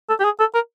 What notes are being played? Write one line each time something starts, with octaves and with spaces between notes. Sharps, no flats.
A4
G4
G#4
A4
A#4